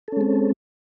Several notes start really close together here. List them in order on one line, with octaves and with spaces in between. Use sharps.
A4 C#4 G#3 C4